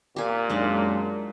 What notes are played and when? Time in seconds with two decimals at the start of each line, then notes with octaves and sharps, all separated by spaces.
0.16 A#2 G4 G#5
0.49 F#2 G#3 D4 D#4 D#5